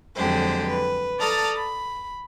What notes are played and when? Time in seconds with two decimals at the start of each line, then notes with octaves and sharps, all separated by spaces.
0.16 F2 D3 F#3 G#3 G4 C5
0.69 B4
1.19 A4 D5 A5 A#5 D#6 F6
1.55 B5